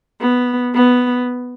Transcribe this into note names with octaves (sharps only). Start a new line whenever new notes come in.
B3
B3